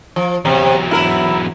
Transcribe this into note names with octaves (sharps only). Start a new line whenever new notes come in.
F3
E2 C3 F#3
E4 A#4